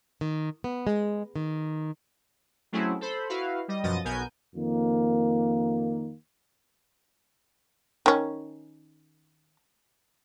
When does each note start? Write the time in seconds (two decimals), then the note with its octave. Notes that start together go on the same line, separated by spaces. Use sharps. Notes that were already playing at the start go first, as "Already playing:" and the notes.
0.21 D#3
0.64 B3
0.87 G#3
1.36 D#3
2.72 F#3 A3 C4 C#4 E4 G#4
3.01 A4 C5 B5
3.29 E4 F#4 B4 F5
3.68 G3 D#5
3.83 F#2 B2 F3 D#5 D#6 A6
4.05 B1 B2 B3 A#4 G#5 G6
4.56 F2 D#3 A#3
8.06 D#3 C#4